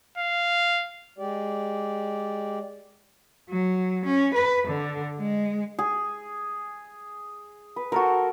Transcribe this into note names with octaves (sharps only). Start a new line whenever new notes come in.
F5
G#3 G4 D5
F#3
C#4
B4
D3
G#3
G#4
B4
F#4 A4 A#4 C5